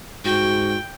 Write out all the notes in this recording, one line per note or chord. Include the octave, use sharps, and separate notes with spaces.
G#2 F#4 G5